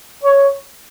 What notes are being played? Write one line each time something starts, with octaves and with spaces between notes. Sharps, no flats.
C#5